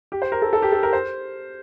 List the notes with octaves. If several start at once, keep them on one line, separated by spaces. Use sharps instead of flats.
G4
C5
A#4
A4
A4
G4
A4
A#4
C5